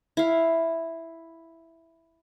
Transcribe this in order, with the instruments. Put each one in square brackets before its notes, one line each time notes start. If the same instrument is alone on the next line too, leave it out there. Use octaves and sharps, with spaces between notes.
[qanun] E4 F5